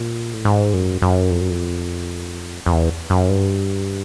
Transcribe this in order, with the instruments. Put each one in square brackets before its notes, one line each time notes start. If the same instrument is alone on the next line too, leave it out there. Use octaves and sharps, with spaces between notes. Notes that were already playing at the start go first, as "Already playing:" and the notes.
Already playing: [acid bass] A#2
A2
G#2
F#2
F#2
F2
F#2
F2
F2
E2
F#2
G2